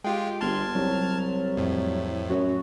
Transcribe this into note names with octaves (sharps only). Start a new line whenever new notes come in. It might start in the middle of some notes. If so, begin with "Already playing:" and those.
G#3 F4 G4 G5
G1 A5 C6 F6 G#6
C2 F#3
F2 A2
F#2 F#4